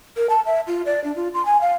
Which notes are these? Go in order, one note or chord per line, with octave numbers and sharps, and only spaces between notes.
A#4
A5
E5
F4
D5
D4
F4
C6
G#5
F5